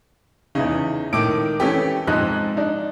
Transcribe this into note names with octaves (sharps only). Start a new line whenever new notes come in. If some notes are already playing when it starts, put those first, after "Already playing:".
E2 C#3 D#4
A2 D#3 D6 D7
E3 A3 C#4 G4
F2 G#2 D#4 F#6
D4 D#4